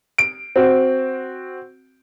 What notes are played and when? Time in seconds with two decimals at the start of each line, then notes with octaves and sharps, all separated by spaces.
0.18 D7
0.56 C4 F#4